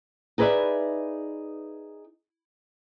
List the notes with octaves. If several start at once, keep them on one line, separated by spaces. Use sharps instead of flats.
D#4 G#4 B4 D5 E5